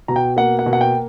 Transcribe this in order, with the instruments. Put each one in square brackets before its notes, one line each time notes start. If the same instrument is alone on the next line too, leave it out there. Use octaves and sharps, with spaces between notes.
[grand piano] B2 A#5
G5
A#3 F#5
F#5
B2
F#5
G5